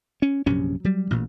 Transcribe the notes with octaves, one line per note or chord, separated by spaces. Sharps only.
C#4
A#1 F#2 C3 C#4
F#3 G3
A1 A#2